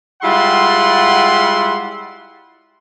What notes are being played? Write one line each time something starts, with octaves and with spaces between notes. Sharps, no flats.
G3 G#3 E4 F4 F#5 C6